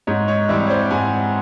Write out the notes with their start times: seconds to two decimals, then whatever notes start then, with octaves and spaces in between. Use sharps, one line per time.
0.07 G#2 C#5 D#5
0.28 C#5 D#5
0.49 E3 G3 C4 D5 E5
0.66 C#5
0.70 C5 D5
0.90 G#2 F#5 G#5